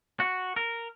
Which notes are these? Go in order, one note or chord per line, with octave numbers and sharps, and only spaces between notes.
F#4
A#4